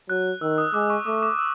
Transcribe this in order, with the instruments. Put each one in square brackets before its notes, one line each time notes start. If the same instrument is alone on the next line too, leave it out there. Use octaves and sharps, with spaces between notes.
[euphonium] F#3 [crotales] F#6
[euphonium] D#3 [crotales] E6
[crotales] D#6
[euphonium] G#3 [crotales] D6
[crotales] C#6
[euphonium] A3 [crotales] D6
[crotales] D6
E6